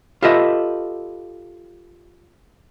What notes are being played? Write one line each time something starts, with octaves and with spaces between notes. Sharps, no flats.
F4 G4 A4 B4 D#5 E5